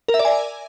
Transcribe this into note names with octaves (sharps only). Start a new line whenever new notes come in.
A#4
E5
D5
G#5